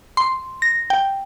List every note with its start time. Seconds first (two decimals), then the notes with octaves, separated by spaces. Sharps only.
0.17 C6
0.62 A#6
0.90 G5